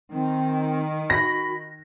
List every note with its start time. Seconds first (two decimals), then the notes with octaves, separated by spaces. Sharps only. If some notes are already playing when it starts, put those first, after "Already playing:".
0.12 D#3 C4
1.10 F#4 B5 A#6